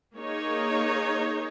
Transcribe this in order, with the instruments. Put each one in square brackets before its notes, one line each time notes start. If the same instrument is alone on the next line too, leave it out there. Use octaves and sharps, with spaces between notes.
[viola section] A#3 D#4 G#4 C#5